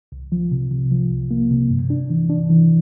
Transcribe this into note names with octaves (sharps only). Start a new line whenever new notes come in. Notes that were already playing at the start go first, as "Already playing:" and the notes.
C2
F3
C3
C3
F3
C2
A#3
C3
G2
D4
E3
D4
E3